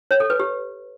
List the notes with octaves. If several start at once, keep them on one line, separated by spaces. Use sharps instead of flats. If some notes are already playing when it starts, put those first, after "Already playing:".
C#5
A4
B4
G4